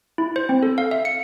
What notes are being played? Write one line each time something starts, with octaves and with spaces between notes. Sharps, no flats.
E4
C5
C4
A4
F5
E5
C#7